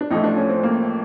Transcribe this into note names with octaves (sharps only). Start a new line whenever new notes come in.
D4
A1 A2 F3 A3 D#4
D4
C#4
C4
A#3